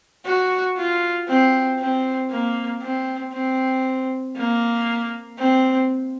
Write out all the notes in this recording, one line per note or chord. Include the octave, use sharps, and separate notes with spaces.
F#4
F4
C4
C4
A#3
C4
C4
A#3
C4